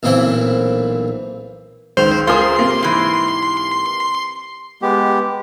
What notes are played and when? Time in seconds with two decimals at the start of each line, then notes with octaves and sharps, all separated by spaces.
0.03 B1 A#2 E3 C4 E4
1.97 C#2 D#3 C5 F7
2.27 C#2 F4 G#4 A#4 C5 C6 D#6
2.59 C3 A#3
2.83 G#2 E3
4.82 G#3 B3 G4